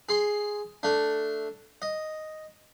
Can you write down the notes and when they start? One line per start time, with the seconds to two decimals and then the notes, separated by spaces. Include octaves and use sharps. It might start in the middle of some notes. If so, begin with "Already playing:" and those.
0.09 G#4 C6
0.83 A3 D4
1.82 D#5